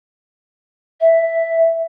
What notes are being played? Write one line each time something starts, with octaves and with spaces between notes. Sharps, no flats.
E5